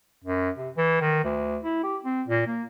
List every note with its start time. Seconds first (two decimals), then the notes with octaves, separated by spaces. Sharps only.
0.24 F#2
0.58 C3
0.77 E3
1.01 D#3
1.24 D2
1.63 E4
1.83 G4
2.05 C4
2.28 A#2
2.47 A#3